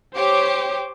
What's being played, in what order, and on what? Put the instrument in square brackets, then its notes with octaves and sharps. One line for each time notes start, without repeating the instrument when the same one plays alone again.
[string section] G4 C#5 [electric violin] C5 D6